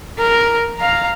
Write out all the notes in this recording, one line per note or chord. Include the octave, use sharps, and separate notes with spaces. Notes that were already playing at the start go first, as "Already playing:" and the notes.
A#4
F5 A#5